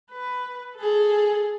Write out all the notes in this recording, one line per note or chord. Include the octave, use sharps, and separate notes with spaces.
B4
G#4 A4